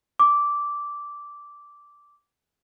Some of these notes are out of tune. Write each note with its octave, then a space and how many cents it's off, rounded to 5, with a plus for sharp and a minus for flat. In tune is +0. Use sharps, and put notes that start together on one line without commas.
D6 -10